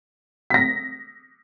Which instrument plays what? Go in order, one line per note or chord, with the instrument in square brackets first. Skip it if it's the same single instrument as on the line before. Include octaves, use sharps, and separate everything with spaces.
[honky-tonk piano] A#6 B6